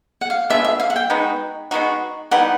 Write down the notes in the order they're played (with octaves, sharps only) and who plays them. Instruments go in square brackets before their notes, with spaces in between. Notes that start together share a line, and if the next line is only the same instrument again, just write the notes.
[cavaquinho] F#5
F5
[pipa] B3 D4 F4 G#4 [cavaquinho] E5
[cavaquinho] E5
F5
F#5
G5
[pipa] G#3 B3 D#4 F#4
G#3 B3 D#4 F#4
[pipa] E3 G3 B3 D#4 [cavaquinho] F#5